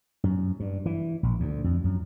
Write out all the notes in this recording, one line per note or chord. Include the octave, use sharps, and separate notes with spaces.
F#2
G2
E3
A#1
D2
F2
F#2